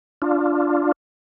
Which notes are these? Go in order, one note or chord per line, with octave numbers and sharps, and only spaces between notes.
D4 F4